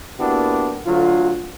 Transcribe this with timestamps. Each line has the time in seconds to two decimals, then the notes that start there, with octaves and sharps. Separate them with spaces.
0.19 A#3 B3 D4 E4 F#4 G4
0.86 D2 D3 F#3 F4